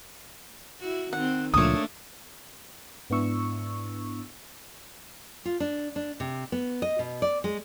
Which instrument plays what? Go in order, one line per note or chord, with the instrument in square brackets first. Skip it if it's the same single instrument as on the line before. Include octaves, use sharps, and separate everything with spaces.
[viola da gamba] E4 F#4
[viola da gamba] D#3 C4 [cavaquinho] F#5
[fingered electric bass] C#2 A#2 F3 [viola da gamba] A3 A#3 D4 [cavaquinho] C#5 D#6
[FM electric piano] G#2 B3 D4 E4 C#6 E6
[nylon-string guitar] F4
D4
D4
C3
B3
D#5
B2
D5
G#3